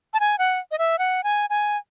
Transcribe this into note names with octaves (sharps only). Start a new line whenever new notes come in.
A5
G#5
F#5
D#5
E5
F#5
G#5
G#5